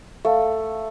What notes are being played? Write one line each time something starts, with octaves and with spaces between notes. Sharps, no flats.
A3 F5